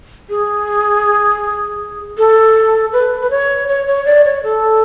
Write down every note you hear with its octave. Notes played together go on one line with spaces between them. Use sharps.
G#4
A4
B4
B4
C#5
C#5
C#5
D5
C#5
A4